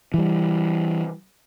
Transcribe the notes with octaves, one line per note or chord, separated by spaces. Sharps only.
E3 G3